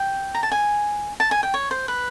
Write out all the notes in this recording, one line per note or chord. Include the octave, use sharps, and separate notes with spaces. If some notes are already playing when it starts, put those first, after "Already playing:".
Already playing: G5
A#5
A5
G#5
A5
G#5
G5
C#5
C5
B4